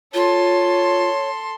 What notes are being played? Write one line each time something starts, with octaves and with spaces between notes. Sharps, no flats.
F4 A4 C#5 C6